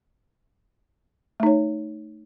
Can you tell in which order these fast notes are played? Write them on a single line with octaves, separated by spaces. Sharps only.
A3 D#4 C#5